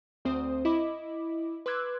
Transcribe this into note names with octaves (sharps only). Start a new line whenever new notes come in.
D2 C4 C5 D#6
E4 D#5 B5 D6
B4 C6 D6 E6 F#6 G#6